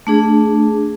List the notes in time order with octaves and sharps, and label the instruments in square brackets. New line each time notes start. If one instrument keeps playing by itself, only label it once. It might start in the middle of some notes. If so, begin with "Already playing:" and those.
[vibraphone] A3 D4 G#4